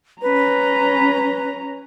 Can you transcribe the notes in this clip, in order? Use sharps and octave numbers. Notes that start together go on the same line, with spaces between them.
C#4 B4 A#5